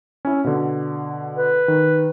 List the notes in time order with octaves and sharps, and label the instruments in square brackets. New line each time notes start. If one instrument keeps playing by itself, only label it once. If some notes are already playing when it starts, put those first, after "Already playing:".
[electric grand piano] C#4 E4
B2 D3
[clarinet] B4
[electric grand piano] D#3